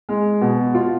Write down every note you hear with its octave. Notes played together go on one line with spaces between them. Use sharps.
G#3
B2
F4